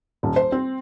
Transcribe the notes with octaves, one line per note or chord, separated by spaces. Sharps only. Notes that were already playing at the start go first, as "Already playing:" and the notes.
D#1
C5
C4